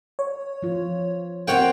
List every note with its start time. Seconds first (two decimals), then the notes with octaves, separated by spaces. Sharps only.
0.19 C#5
0.62 F3 F4
1.48 A#3 C4 C#5 F#5 G5